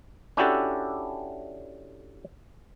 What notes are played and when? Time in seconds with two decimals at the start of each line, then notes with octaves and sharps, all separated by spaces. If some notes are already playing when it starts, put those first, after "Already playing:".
0.37 C#4 D4 E4 F#4 G4 A4